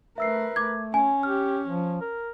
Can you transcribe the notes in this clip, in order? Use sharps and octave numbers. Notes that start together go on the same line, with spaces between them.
A3 A#4 B4 E5 E6 C7
A3 D6 G#6
C#4 G#5
G4 F6
F3
A#4